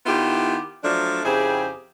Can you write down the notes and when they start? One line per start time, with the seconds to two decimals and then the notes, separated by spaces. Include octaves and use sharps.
0.06 D#3 B3 E4 F4 G4
0.83 F3 F#3 A3 D4
1.24 F2 C#3 C4 E4 G4 G#4